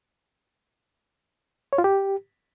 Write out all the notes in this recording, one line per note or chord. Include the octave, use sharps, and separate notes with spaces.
C#5
F4
G4